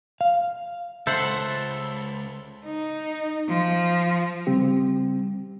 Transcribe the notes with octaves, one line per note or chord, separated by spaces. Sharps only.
F5
C#2 A4 C5 E5 F#5
D#4
F3
C#3 G3 C4 G4